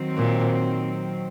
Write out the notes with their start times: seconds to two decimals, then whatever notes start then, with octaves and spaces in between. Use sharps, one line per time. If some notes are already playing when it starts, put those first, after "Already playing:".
Already playing: D#3 F#3 C4
0.16 A#2